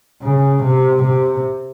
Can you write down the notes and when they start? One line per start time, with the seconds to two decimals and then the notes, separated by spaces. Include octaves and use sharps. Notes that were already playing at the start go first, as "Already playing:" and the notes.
0.23 C#3
0.63 C3
1.03 C3